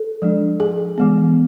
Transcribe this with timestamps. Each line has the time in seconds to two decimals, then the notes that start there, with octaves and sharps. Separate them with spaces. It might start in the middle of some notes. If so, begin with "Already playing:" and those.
Already playing: A4
0.22 F3 G#3 D4
0.60 G#4
0.98 E3 G#3 B3